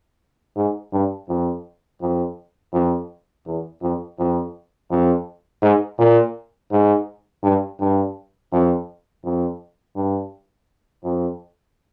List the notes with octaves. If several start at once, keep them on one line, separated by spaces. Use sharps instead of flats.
G#2
G2
F2
F2
F2
E2
F2
F2
F2
G#2
A#2
G#2
G2
G2
F2
F2
G2
F2